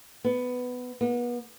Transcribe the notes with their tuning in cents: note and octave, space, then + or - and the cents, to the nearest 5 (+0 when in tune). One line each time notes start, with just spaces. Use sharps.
B3 +10
B3 -35